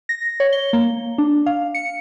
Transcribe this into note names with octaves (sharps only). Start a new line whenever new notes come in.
A#6
C#5
G7
A#3
D4
F5
C#7